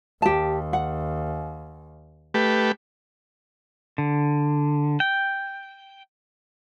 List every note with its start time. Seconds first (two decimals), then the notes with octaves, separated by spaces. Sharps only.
0.22 D#2 G4 A5
0.73 F#5
2.34 A3 G4 B4
3.98 D3
5.00 G5